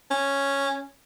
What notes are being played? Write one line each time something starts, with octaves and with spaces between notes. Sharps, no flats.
C#4